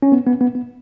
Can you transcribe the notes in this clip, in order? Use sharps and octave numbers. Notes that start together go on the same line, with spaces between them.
C#4
B3
B3
B3
B3